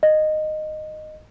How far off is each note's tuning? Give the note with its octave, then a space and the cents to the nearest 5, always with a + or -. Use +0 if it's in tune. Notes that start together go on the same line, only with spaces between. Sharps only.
D#5 -10